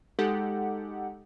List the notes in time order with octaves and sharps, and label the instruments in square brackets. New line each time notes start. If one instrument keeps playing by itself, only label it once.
[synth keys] G#3 D#4 G4 A4 F#5